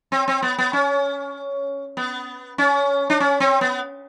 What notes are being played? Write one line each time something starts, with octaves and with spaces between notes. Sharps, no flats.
C4
C4
B3
B3
C#4
B3
C#4
D4
C#4
C4
B3